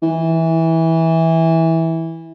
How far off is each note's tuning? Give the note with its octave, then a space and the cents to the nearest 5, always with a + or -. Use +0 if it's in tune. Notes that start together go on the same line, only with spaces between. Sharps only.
E3 -15